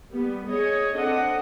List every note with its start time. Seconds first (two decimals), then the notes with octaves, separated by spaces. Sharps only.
0.12 G3 B3
0.47 G#4 C#5 D#5
0.94 C4 D4 A4 D#5 F#5